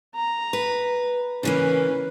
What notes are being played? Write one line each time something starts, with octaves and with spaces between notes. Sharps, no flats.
A#5
B4
C#3 E3 A#3 C#4 B4